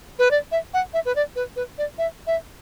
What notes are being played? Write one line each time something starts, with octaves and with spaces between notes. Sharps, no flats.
B4
D5
E5
F#5
E5
B4
D5
B4
B4
D5
E5
E5